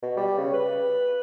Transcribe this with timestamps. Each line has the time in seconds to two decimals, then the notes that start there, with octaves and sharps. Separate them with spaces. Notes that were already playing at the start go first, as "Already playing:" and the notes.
0.03 B2
0.17 G3
0.38 C#3
0.53 B4